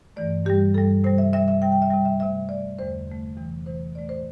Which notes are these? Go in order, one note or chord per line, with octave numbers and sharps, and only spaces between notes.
G2 E3 A3 D5
G2 G3 G4
G2 G3 A4
C3 G3 C5
E5
C3 G3 E5
E5
C3 G3 G5
G5
E5
C3 G3 G5
E5
C3 A3 E5
C3 A3 D5
E2 D3 A3 C5
E2 D3 A3
E2 C3 E3 A3
E2 C3 E3 A3 C5
A2 A3 D5
C5